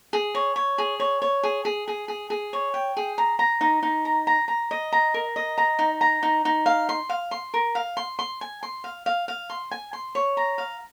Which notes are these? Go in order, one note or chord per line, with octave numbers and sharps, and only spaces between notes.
G#4
C#5
C#5
G#4
C#5
C#5
G#4
G#4
G#4
G#4
G#4
C#5
G5
G#4
A#5
A#5
D#4
D#4
A#5
A#5
A#5
D#5
A#5
A#4
D#5
A#5
D#4
A#5
D#4
D#4
F5
C6
F5
C6
A#4
F5
C6
C6
G#5
C6
F5
F5
F5
C6
G#5
C6
C#5
A#5
F5